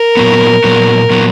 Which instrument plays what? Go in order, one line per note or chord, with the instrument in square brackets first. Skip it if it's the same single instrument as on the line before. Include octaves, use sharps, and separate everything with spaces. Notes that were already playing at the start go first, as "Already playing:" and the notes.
Already playing: [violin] A#4
[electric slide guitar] A#2 F#3 B3
A#2 F#3 B3
A#2 F#3 B3